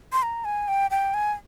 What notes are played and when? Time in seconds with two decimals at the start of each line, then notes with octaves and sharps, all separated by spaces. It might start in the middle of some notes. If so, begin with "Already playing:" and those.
0.13 C6
0.23 A#5
0.45 G#5
0.68 G5
0.91 G5
1.14 G#5